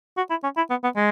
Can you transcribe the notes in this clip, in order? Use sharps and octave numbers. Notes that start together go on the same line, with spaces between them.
F#4
E4
C#4
E4
B3
B3
G#3